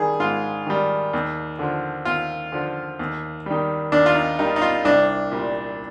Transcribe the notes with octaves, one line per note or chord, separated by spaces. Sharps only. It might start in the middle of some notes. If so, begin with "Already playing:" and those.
Already playing: D#3 G3 G#4
G#2 F4
D#3 G3
D#2
D3 F3
D#2 F4
D3 F3
D#2
D#3 G3
D#2 D4
F4
D#4
D#3 G3 D#4
D#4
F4
C2 D4
A#2 G3